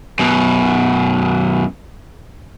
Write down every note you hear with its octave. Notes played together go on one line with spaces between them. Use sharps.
F#2 B2